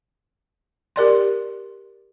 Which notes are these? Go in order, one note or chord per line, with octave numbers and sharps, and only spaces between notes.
G4 A#4 D5 C6